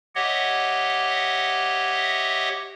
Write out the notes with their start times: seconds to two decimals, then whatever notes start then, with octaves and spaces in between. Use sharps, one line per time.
0.15 G4 C#5 D#5 E5 F#5